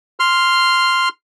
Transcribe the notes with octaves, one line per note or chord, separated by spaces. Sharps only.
C6 F6